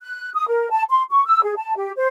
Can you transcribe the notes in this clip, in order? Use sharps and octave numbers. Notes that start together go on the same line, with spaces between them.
F#6
D#6
A#4
A5
C6
C#6
E6
G#4
A5
G4
C5